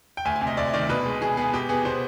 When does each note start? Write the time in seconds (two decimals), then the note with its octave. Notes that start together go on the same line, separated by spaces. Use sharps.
0.17 G5
0.25 D2 G#5
0.36 G#5
0.41 C3
0.47 D#5
0.57 D2 D5
0.74 D#3 D5
0.89 B2 B4
1.05 G#3
1.22 B2 G#4
1.37 B3 G#4
1.53 B2 G4
1.69 B3 G#4
1.85 B2 C5